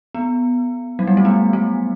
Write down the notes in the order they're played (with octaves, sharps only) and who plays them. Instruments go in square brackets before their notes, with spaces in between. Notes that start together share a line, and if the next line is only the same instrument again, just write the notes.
[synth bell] B3
F#3
G3
A3
B3
A3